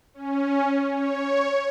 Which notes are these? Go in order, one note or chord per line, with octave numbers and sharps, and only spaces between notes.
C#4
C#5